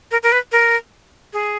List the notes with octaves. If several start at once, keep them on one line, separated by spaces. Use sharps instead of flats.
A#4
A#4
B4
A#4
G#4